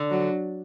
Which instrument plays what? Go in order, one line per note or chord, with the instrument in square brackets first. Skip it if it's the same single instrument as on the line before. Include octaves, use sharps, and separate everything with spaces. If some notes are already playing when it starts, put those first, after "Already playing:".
Already playing: [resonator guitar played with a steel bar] D3
[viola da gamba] F#3